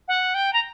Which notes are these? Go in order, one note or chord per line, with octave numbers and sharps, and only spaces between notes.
F#5
G5
A#5